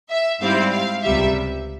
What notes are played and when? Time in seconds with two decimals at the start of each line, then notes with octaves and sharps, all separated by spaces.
0.10 E5
0.40 G#2 G3 C4 E4 F5
0.71 F5
1.02 C#2 C3 G3 E5